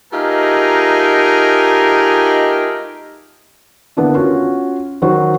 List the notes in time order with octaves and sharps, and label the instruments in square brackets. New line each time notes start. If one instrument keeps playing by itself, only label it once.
[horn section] A3 D#4 F4 G4 G#4 A#4
[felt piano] D3 A#3 B3 D4 E4
C#4 F4 F#4
D#3 F#3 F#4 C5